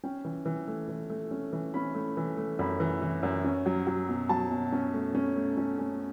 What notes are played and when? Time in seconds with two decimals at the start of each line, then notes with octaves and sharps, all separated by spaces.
0.04 C#4 G5
0.25 E3
0.46 E3
0.67 A3
0.89 E3
1.10 A3
1.31 C#4
1.53 E3
1.74 C#4 B5
1.95 A3
2.17 E3
2.37 A3
2.59 F#2 B5
2.80 E3
3.02 E3
3.23 F#2
3.44 C#4
3.66 F#3
3.87 F#3
4.09 B2
4.29 F#3 A5
4.50 B2
4.72 C#4
4.94 A3
5.15 C#4
5.36 A3
5.57 C#4
5.79 C#4